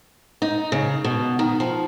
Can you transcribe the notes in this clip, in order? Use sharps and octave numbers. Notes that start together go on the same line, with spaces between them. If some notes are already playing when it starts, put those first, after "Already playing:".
D#4
C#3
B2
D#3
F3